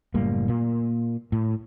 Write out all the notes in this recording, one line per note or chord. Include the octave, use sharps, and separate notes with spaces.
F#1 A2 G3 A#3
A#2 A#3
A2